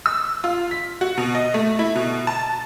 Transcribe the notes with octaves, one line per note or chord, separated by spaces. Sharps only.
E6
F4
B6
F#4
B2
D#5
A3
E4
B2
A5